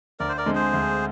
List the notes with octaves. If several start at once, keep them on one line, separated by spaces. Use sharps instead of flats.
D2 A#4 D5
C5
A#4 D5
D3 G#3 C4
G#4 C5
D2